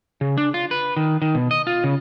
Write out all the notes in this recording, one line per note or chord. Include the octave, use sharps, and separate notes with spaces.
C#3
D4
F4
B4
D#3
D#3
B2
D#5
F4
C#3